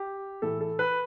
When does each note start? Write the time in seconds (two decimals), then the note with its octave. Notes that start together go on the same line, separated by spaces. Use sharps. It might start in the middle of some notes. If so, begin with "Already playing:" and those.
Already playing: G4
0.42 A2 E3 A3 A4
0.61 A4
0.79 B4